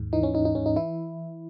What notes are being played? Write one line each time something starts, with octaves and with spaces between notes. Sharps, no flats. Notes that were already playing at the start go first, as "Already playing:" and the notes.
Already playing: D#2 G#2
E3 D#4
C#4
G#2 D#4
D#4
G#2 C#4
D#4
E3 E4